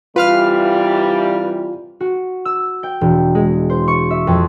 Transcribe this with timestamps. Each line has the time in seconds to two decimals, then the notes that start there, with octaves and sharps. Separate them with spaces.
0.16 C3 E3 G3 F4 B4 F5 F6
2.01 F#4
2.45 E6
2.83 G5
3.01 E1
3.35 G#3
3.70 C5
3.88 C#6
4.10 E5
4.27 F2